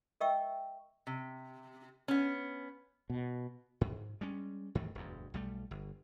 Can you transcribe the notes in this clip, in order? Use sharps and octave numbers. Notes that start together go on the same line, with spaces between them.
A#4 D#5 E5 G5 C#6 E6
C3
B3 C#4
B2
G#2
G3 G#3 C#4
G#2 D#3 E3 A3
E1 D2 G2
B1 G3 A3
G1